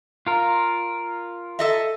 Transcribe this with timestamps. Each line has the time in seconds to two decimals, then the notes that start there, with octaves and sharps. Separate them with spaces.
0.27 F4 A#4
1.59 A4 D#5 E5